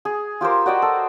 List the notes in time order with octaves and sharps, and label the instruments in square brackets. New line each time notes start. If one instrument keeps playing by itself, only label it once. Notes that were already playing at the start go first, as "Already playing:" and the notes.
[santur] G#4
F4 G4 A#4 C5
F#4 D5 D#5 G5
A4